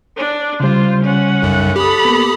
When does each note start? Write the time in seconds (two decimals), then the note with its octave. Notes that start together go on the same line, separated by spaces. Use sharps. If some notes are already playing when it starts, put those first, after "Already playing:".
0.17 D4
0.60 C#3 G3 F4 C5
1.03 C#4 F#5
1.42 B1 F#2
1.76 G4 A4 B5 D#6
2.05 A#3 B3